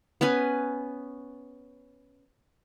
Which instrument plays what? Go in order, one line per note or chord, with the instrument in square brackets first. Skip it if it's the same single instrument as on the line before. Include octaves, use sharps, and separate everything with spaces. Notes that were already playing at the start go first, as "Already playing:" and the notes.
[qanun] B3 C#4 B4 G#5